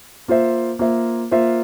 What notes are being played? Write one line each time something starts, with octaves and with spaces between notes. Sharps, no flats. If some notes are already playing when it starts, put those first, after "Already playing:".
A#3 F4 C5 E5
A#3 F4 C5 E5
A#3 F4 C5 E5